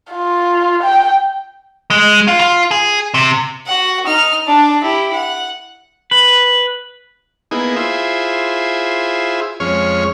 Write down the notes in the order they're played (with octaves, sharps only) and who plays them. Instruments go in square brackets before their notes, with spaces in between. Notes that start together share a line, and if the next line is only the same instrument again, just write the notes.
[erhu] F4
G5
[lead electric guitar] G#3
F4
F4
G#4
C3
[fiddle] F#4 F#5
D#4 F6
D4 A5
E4 G4
F#5
[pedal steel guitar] B4
[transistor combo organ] A#3 B3 D#4 E4 G#4
E4 F4 G#4 C5 E5
F2 G#3 C#4 C#5 F6